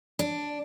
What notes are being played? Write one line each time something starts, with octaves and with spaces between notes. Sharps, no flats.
D4